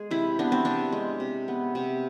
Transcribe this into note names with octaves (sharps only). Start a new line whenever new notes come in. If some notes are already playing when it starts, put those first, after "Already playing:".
Already playing: G#3 G#4
C3 E4
B3 D4
C4
C3 D4
G#3
C3
B3
C3